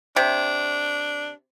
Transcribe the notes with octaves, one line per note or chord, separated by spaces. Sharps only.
C3 D4